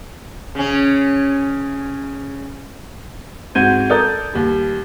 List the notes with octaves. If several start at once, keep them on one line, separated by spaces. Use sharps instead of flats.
C#3 C#4
G#2 C4 F#4 G6 G#6 D#7
A4 A#4 D5 D#6 G6
D#2 G3